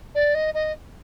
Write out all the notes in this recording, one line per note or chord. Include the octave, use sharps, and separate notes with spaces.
D5
D#5
D#5